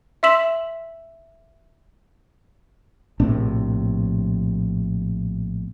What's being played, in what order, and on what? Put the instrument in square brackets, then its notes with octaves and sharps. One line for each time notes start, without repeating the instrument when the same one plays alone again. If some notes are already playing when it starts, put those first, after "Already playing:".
[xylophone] E5 C6 E6 B6 E7 F#7
[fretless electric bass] A#1 A2 C3 D4